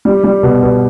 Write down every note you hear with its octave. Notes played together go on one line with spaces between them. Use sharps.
G3
G3
B2
B2